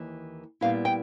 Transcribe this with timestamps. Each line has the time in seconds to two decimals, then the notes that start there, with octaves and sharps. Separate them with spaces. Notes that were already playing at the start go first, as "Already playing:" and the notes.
Already playing: D#2 E3
0.61 A#2 G3 B3 E4 F5
0.85 G5